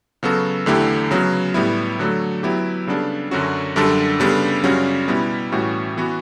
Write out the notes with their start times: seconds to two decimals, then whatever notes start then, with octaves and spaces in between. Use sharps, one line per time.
0.23 C#3 F#3 B3 F#4 A4
0.66 E2 D3 A3 E4 G4
1.11 C#3 F#3 B3
1.54 A2 G3 B3 E4
1.99 D3 F#3 A3
2.43 F#3 B3 E4 G4
2.87 C#3 G3 B3 D4 A4
3.31 F#2 D3 F#3 C#4 F#4
3.76 F#2 D3 G3 D4 A4
4.20 C#3 G3 B3 D4 A4
4.63 F#2 C#3 G3 C#4 F#4
5.08 B2 G3 B3 E4
5.52 A2 E3 G3 C#4 F#4
5.97 E3 B3 F#4